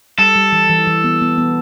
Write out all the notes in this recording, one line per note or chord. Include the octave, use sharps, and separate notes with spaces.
G3 A4
G3
E3
E3
E3
B3
B3
B3